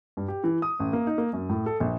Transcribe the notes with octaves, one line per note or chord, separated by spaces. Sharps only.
G2
G4
E3
D#6
A1
A#3
D#4
A#3
F#2
A2
A4
A#1